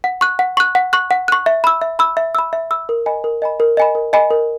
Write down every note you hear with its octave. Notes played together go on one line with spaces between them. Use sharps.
F#5
C#6 F#6
F#5
C#6 F#6
F#5
C#6 F#6
F#5
C#6 F#6
E5
B5 E6
E5
B5 E6
E5
B5 E6
E5
B5 E6
A#4
D#5 G#5 B5
A#4
D#5 G#5 B5
A#4
D#5 G#5 B5
A#4
D#5 G#5 B5
A#4